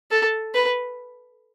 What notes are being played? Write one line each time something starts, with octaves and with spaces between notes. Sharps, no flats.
A4
B4